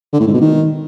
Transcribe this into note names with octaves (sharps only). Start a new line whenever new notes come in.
D3
A2
G#2
B2
D#3